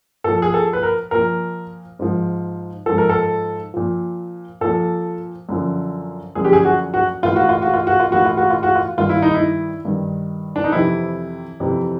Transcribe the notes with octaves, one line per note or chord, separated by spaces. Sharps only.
A#2 F3 A4
G#4
A4
B4
A#4
A#2 F3 A#4
G#2 F3
G#2 F3 A4
A#4
A4
A#2 F3
A#2 F3 A4
F#2 D3 F3
F#2 D3 F3 G#4
G4
G#4
F#4
F#4
A2 E3 F4
F#4
F4
F#4
F4
F#4
F4
A2 E3 F#4
F4
F#4
F4
F#4
F4
G2 D#3 F4
E4
D#4
E4
G2 D#3
D4
D#4
F2 C3 E3 E4
F2 C3 E3